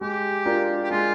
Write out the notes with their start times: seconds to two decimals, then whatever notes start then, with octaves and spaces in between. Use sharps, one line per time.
0.01 G#3 G4
0.46 D4 F4 A#4
0.84 G4
0.91 G#3 F4